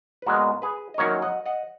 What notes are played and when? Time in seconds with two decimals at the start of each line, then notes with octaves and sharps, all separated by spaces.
0.22 B4
0.26 A#2 G#3 B3 F#4 A#4
0.62 G#4 B4
0.94 D#5
0.98 F#2 D#3 F#3 A#3 C#4 A#4 C#5
1.22 D#5 F#5
1.46 D#5 F#5